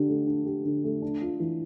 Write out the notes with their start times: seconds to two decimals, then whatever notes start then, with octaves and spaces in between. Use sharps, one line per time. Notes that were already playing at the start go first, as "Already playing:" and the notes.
Already playing: D3 D4 G4
0.09 A3
0.27 D4
0.46 G4
0.65 D3
0.84 A3
1.02 D4
1.21 F4
1.40 E3